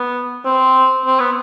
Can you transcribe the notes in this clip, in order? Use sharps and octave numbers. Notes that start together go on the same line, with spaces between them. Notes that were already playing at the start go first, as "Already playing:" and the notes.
Already playing: B3
C4
C4
B3